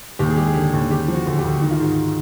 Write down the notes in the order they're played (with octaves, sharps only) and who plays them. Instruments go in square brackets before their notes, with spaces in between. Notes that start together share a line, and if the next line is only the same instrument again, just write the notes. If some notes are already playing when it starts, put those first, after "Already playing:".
[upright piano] D#2 G4
G#4
G#3 G4
G#4
D3 G4
D#2
C#3 G4
F3
F#4
D2
G4
D2
D#3 F#4
F4
G#2 F#4